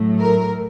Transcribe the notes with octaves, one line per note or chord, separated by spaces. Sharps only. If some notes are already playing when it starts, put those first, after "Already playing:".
Already playing: A2 F#3 A3
A#4